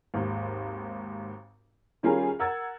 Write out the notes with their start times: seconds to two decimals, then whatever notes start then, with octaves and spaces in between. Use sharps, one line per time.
0.14 G#1 D#2
2.03 D#3 G3 C#4 F4 G#4 A#4
2.39 A#4 F#5 E6 G#6 A6